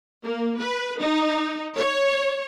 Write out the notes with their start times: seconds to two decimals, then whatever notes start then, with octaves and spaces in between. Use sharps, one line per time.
0.24 A#3
0.59 B4
1.00 D#4
1.76 C#5